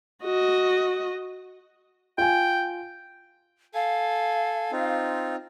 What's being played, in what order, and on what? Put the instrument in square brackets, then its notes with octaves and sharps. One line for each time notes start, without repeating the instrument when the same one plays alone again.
[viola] F#4 D#5
[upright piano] F4 G#5 [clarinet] G5
[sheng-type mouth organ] A4 G#5 [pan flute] F5
[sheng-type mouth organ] C4 D#4 F4